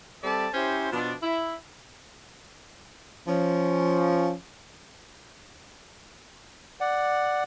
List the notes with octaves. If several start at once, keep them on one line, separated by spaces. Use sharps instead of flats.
G3 C4 A4 D5 E5 A5
C#4 E4 G4 C5
B2 F3 D4
E4
F3 C#4
D5 F#5